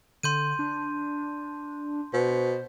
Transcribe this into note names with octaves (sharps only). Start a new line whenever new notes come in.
D3 C6 G6 D#7
D4
B2 C5